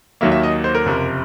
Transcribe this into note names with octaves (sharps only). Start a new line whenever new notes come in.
D#2 D#3 F#3 A#3 E5
E5
D#5
C5
A#4
F#1 F2 C3